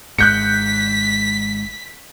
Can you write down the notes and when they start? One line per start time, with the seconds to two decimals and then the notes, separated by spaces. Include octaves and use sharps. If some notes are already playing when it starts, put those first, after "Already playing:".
0.18 G#1 G#2 F#6 G6 B6 C#7